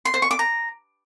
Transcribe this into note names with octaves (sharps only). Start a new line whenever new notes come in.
C6
C5
C#6
D6
A#5